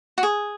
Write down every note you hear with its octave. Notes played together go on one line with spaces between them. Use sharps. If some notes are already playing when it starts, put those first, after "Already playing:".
F#4
G#4